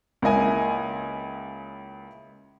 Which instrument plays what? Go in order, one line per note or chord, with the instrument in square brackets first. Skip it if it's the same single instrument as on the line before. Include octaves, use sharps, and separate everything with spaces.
[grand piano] C#2 A#3 E4 D#5 G#5